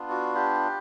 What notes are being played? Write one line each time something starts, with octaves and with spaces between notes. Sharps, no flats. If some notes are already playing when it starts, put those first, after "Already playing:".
Already playing: B3 D4 F4
F#4
G4